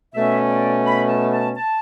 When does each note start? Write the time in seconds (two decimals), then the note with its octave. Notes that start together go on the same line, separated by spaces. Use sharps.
0.14 B2 A3 C#4 E5
0.49 D5
0.86 B5
1.09 A5
1.33 A5
1.57 A5